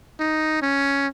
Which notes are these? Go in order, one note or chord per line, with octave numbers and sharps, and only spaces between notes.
D#4
C#4